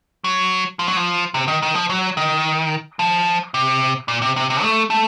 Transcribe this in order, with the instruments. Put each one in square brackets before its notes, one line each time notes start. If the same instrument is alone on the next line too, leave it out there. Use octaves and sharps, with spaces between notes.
[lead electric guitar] F#3
F3
F#3
F3
C3
D#3
D#3
F3
F#3
D#3
F3
C3
A#2
C3
C3
C3
A3
A3